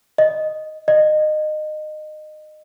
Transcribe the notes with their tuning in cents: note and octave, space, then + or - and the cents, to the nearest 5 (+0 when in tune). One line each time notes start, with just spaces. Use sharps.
D#5 -5
D#5 -25